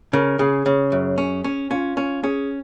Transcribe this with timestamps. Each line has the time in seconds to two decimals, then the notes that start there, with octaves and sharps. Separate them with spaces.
0.13 C#3 A#4
0.39 C#3 G#4
0.66 C#3 G#4
0.92 F#2
1.18 C#4
1.44 C#4
1.71 C#4 F4
1.97 C#4
2.23 C#4 G#4